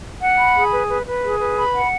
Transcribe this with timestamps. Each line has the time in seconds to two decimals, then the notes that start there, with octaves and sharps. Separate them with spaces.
0.21 F#5
0.38 B5
0.55 G#4
0.72 B4
0.89 B4
1.06 B4
1.23 G#4
1.40 B4
1.58 B5
1.75 F#5